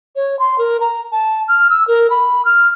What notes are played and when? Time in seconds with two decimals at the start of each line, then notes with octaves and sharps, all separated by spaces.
0.16 C#5
0.39 C6
0.58 A#4
0.81 A#5
1.12 A5
1.48 F6
1.70 E6
1.88 A#4
2.10 B5
2.45 F6